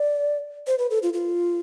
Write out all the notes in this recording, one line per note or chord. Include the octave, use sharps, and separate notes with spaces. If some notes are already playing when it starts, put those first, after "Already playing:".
Already playing: D5
C5
B4
A4
F4
F4